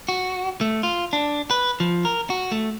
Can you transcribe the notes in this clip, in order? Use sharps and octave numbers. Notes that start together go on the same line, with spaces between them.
F#4
A3
F4
D4
B4
F3
A#4
F#4
A3